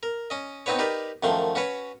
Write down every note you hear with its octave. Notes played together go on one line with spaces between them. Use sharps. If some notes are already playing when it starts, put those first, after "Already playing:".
A#4
C#4 D#5
B3 C4 D#4 F#4 B4 C#5
D#4 G4 A#4 B4 D5
F#2 D#3 F3 A3 C6
C#4 F#4 B4 C#5